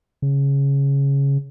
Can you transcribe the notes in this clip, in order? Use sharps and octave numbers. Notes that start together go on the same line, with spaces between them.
C#3